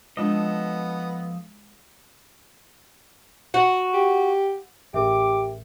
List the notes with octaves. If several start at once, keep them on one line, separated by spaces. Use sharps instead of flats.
F3 G#3 B3 D4 F4 A4 D#5
F#4 F#5
G4
A1 G4 G#4 A#4 E5 D6